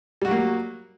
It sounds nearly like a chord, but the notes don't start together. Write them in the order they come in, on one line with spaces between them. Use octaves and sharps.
G3 F#4 F#3 A#3